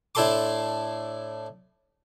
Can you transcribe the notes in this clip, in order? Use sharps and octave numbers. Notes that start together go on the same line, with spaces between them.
A2 D4 E4 A4 C6 D6